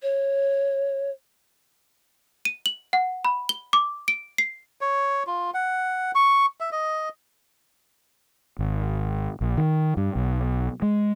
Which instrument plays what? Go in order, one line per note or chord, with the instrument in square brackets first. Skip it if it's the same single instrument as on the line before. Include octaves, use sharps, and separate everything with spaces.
[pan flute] C#5
[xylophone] D#7
F#7
F#5
B5
G7
D6
D7
C7
[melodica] C#5
F4
F#5
C#6
E5
D#5
[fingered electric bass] G#1
A#1
D#3
G2
B1
G#3